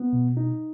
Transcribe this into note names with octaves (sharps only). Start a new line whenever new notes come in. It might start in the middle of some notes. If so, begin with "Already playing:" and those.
Already playing: B3
B2
D#4